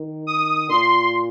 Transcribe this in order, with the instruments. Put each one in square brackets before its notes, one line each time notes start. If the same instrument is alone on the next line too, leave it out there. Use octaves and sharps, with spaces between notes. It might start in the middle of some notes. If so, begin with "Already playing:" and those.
Already playing: [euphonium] D#3
[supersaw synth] D#6
[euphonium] A#2 [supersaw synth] C6